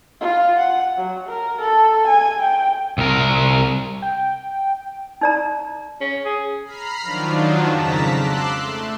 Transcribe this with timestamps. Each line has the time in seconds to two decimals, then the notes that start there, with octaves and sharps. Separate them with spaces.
0.20 F4
0.58 F#5
0.97 F#3
1.28 A#4
1.61 A4
2.07 G#5
2.40 G5
2.98 C2 A#4
4.02 G5
5.21 D#4 D5 A#5
6.01 C#4
6.25 G#4
6.64 A#5 B5 F6 C7
7.02 D#3 F3 F#3 D4 F4
7.68 F2 G#2 C#3 A5 A#5 B6
8.09 C6 D6 E6 F#6
8.61 A3